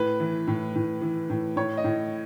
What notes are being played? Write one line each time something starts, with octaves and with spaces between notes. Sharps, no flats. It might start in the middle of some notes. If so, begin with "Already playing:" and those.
Already playing: A2 B4
E3
A2
A2
E3
A2
A2 C#5
D#5
A2